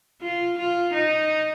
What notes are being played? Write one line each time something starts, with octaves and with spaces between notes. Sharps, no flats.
F4
F4
D#4